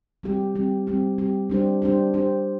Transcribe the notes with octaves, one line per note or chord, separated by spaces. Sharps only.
G3 C4 G4
G3 C4 G4
G3 C4 G4
G3 C4 G4
G3 D4 G4 C5
G3 D4 G4 C5
G3 D4 G4 C5